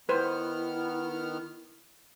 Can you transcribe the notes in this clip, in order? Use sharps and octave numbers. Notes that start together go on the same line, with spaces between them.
D#3 B3 E4 B4 C5 F6